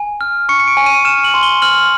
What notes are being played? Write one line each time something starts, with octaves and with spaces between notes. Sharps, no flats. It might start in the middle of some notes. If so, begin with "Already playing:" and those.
Already playing: G#5
F6
C#6 C#7
C#7
D7
G#5
D#7
F6 E7
F#7
C6
G7
F6 F#7